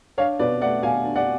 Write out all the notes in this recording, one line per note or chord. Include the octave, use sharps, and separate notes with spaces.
D4 C#5 F5
B2 B4 D5
A3 D5 F#5
B2 F5 G#5
D4
D5 F#5